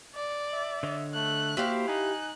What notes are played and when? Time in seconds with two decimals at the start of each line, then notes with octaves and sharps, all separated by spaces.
0.16 D5
0.53 E5
0.83 D3 C#5 D#5
1.14 A3 F#6
1.57 A#3 E4 F#4 G4 C5 F5
1.88 D#4 G#5 F#6